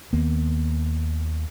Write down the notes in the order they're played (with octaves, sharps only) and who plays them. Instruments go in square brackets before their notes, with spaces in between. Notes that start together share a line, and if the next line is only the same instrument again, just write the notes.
[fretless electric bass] D#2 D#3 A#3 B3